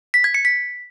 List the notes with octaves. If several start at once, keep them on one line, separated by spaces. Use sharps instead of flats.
B6
G#6
C#7
B6